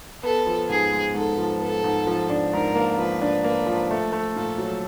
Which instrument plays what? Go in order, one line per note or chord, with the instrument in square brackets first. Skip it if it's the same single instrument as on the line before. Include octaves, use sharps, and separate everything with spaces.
[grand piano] B3 [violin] A4
[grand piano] F3
[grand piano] G#2 [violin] G#4
[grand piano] G#3
[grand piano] G#2 [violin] A4
[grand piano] F3
[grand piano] B3 [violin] A4
[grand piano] G#2
F3
D4
[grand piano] G#2 [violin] A#4
[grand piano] A#3
[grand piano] F3 [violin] B4
[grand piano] D4
[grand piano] A#3 [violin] B4
[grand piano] F3
[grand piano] A3 [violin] A4
[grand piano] A3
[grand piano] A#2 [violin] A4
[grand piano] F#3